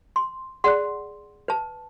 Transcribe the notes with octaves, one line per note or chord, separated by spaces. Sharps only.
C6
G#4 D5 F#5 C6 F#6
B4 A5